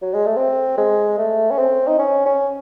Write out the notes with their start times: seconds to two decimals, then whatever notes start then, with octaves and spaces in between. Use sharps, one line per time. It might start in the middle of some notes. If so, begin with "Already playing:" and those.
0.02 F#3
0.14 G#3
0.26 A3
0.36 C4
0.78 G#3
1.18 A3
1.51 C#4
1.58 C4
1.87 D#4
1.99 C#4
2.25 C#4